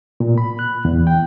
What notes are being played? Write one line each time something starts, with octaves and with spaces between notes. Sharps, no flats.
A#2
B5
F#6
E2
G5